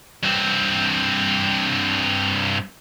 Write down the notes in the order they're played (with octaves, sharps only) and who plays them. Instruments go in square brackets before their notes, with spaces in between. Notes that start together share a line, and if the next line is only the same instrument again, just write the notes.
[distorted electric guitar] G2 C4